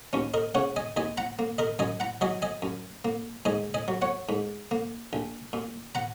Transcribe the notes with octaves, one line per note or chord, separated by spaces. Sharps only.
D#2 C#4
A#4 D#5
C#3 C#5 F#5
D#5 G#5
D#2 D#5 G#5
F#5 A#5
A#3
A#4 D#5
F#2 D#5 G#5
F#5 A#5
F#3 D#5 G#5
D#5 G#5
F#2
A#3
G#2 D#5 G#5
D#5 G#5
F#3
C#5 F#5
G#2
A#3
A#1
A#2
F#5 A#5